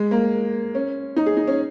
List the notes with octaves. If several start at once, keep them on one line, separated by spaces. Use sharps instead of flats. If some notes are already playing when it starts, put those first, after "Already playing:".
Already playing: G#3
A#3
C#4
D#4
G#4
D#4
C#4